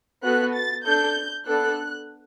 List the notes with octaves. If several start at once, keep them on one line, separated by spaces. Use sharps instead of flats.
B3 F#4 A4 F#6
A6
D4 A4 G6
B3 D4 A4 F#6